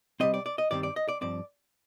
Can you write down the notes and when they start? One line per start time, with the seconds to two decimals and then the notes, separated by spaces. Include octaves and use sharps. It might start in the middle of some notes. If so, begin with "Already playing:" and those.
0.20 C3 G3 C4 D#5
0.34 D5
0.46 D5
0.58 D#5
0.71 G2 D#3 G3 C4 D5
0.83 D5
0.96 D#5
1.09 D5
1.21 G2 F3 C4 D5